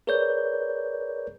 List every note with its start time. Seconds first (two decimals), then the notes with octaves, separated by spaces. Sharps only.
0.07 G#4 A#4 B4 C#5 D5 G6